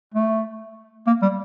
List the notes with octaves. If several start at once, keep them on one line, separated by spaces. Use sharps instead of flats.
A3
A#3
G3